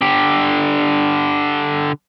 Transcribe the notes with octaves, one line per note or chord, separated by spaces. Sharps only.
D3 G4